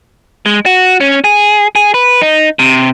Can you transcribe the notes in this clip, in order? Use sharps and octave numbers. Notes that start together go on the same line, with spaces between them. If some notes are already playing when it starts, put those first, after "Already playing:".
G#3
F#4
C#4
G#4
G#4
B4
D#4
C3